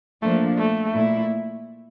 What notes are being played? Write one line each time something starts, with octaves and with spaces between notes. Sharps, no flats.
A#2 F3 A3 A#3 D4
A3
A#2 A3 E4